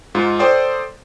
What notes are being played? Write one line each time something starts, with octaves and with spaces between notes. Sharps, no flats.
G#2 F4
A4 C5 D5 G5 C6 D#6